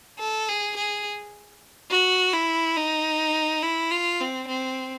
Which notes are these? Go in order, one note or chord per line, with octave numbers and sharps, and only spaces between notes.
A4
G#4
G#4
F#4
E4
D#4
E4
F4
C4
C4